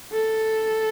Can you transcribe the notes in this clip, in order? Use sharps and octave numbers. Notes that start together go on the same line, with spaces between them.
A4